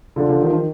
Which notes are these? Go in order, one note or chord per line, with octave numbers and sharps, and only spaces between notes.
D3 F3
D3 F3
D#3
F3
D#3